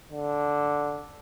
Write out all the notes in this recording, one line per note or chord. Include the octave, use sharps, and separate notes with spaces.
D3